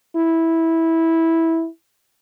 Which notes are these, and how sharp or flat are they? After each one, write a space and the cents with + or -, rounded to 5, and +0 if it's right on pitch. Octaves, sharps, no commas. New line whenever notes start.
E4 -10